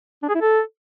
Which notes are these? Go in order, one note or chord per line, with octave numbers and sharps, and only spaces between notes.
D4
G#4
E4
A4